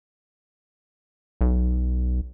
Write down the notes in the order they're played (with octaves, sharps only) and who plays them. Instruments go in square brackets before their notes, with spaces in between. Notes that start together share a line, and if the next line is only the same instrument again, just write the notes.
[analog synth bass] B1